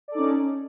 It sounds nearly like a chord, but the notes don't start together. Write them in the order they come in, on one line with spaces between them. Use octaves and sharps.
D5 A4 D#4 C#4